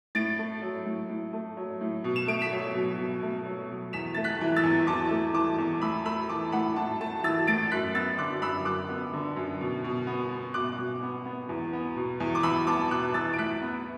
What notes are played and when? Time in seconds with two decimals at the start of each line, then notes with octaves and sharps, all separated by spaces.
0.15 A2 A6 D7
0.38 A3
0.62 F#3
0.86 A2
1.09 A2
1.33 A3
1.57 F#3
1.81 A2
2.04 B2
2.16 E7
2.27 A3 D7
2.41 B6 E7
2.52 F#3
2.74 B2
2.98 B2
3.22 A3
3.46 F#3
3.69 B2
3.93 E2 B6 E7
4.14 A3 A6
4.24 F#6 B6
4.41 E3
4.56 E6 A6
4.63 E2
4.87 E2 A5 D6
5.11 A3
5.34 E3 A5 D6
5.58 E2
5.81 A2 B5 E6
6.05 A3 B5 E6
6.29 E3 A5 D6
6.52 A2 F#5 B5
6.76 A2 A5
7.00 A3 A5
7.23 E3 E6 A6
7.47 A2 A6 D7
7.71 F#2 F#6 B6
7.94 B3 E6 A6
8.18 D3 D6 F#6
8.42 F#2 B5 E6
8.65 F#2 D6 F#6
8.89 B3
9.13 D3
9.36 F#2
9.61 B2
9.84 B2
10.07 B3
10.31 B3
10.54 B2 D6 F#6
10.78 B2
11.03 B3
11.25 B3
11.49 E2
11.73 B3
11.96 B2
12.20 E2
12.35 D6
12.43 E2 B5 E6
12.67 B3 A5 D6
12.90 B2 D6 F#6
13.03 F#6
13.14 E2 E6 A6
13.34 D7
13.38 A2 F#6 B6
13.62 B3